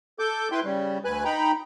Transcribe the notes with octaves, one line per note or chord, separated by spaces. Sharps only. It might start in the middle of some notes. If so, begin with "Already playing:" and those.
A4 D6 G6
E4 B4 G5 C6
C#3 G3
D2 B4 G#5 F#6
D#4 G5 A#5 B5